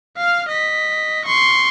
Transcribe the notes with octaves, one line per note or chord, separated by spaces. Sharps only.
F5 F6
D#5 B6
C6 C#6